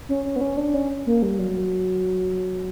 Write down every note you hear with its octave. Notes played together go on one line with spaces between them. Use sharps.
C#4
C#4
B3
C#4
D4
C#4
A#3
G3
F#3